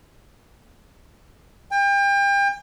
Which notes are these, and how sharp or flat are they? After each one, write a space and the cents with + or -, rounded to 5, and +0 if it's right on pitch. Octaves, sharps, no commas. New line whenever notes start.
G5 +35